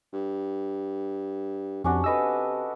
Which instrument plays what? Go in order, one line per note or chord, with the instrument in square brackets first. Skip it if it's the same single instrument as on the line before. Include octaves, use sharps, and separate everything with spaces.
[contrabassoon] G2
[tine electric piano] F2 [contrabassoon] C3 [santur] C#4 D4 F#4
[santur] A4 B4 [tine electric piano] D#5 E6